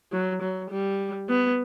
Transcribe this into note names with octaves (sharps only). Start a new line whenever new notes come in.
F#3
F#3
G3
B3